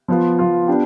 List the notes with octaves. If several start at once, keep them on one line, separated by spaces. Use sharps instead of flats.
F3 B3 F4
F3 B3 F4
B3 D4 G4